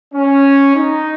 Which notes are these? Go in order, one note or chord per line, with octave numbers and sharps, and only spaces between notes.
C#4
D#4